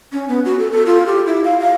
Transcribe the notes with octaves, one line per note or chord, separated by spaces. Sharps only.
C#4
B3
F#4
A4
A4
F4
G4
E4
F5
F5